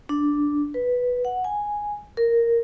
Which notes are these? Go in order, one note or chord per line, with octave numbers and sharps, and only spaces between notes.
D4
B4
F#5
G#5
A#4